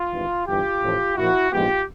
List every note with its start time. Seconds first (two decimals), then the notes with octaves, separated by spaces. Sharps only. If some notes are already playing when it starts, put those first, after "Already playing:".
Already playing: F4
0.11 G#1 G2 E3
0.46 G1 G2 E3 F4 G4
0.82 A1 A2 F3
1.16 A#2 F3 A#3 E4 F#4
1.51 A#1 G#2 F3 G#3 B3 F4 G4